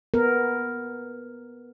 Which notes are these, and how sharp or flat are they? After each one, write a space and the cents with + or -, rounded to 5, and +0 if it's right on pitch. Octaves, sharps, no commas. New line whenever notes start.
B3 -10 A#4 +0